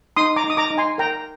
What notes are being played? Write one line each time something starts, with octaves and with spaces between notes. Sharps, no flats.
D#4 C6 D#6
A#5 D6
D#4
D#6
A#5 D6
D#4
G#5 C6
A#4 G5 A#5